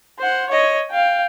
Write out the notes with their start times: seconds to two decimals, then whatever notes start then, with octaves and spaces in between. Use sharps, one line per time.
0.19 C5 F#5
0.49 C#5 D#5
0.90 F5 G5